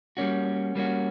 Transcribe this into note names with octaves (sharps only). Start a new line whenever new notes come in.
G3 A#3 C#4 F#4
G3 A#3 C#4 F#4